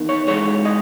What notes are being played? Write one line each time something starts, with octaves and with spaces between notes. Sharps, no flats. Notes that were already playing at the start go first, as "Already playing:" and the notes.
Already playing: E2 D#3
C#5
G#2 E3 G#3 C#5
D#5